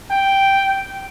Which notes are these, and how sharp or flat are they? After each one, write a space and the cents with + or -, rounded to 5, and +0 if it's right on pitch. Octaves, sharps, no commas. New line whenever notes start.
G5 +0